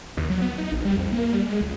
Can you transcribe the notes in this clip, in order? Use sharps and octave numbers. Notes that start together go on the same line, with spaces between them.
D#2
F#3
B3
D#4
A#1
G3
F2
A#3
G3
G#3
C#2